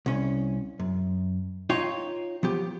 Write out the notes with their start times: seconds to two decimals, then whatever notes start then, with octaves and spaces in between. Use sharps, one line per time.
0.06 C2 C#4
0.80 F#2
1.70 D#4 F4 C#5 G5
2.43 F3 B3 G4